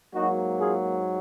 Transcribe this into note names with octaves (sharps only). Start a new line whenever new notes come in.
G#2 F#3 A#3 D#4 F#4
F4 G#4